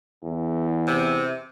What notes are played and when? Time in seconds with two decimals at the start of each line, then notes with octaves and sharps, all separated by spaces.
0.23 E2
0.87 C3